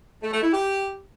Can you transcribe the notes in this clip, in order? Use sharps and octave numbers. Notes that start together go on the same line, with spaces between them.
A3
A3
E4
G4